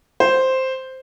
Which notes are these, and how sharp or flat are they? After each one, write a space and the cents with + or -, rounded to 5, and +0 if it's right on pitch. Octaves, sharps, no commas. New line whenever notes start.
C5 +0